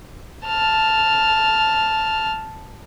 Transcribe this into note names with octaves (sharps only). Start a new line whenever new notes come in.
A5 F6